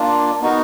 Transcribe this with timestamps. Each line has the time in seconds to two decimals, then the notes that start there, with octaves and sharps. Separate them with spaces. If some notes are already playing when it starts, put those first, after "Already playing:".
Already playing: A#3 D4 F4
0.41 B3 D#4 F#4 A#4